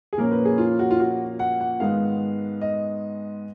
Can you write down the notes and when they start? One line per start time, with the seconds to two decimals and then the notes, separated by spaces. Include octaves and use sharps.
0.13 G#4
0.17 A#2 F3 A#3 C#4 A#4
0.31 B4
0.45 G#4
0.58 F4
0.79 F#4
0.91 F4
1.00 F#4
1.39 F#5
1.60 F#5
1.80 G#2 D#3 G#3 B3 F5
2.61 D#5